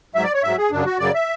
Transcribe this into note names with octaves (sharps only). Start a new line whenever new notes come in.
G#2 F#3 E5
D5
C#5
G#2 F#3 E5
G#4
F#2 C#3 F#3 D4
F#4
F#2 C#3 F#3 D5
E5